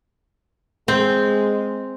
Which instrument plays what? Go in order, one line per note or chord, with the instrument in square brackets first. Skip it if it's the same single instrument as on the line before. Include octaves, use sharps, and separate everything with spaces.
[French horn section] G#3 [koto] C4